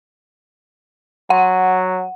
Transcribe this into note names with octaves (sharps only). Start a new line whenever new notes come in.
F#3 F#5